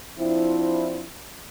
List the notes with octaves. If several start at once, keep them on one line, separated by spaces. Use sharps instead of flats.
F3 C4 D4 E4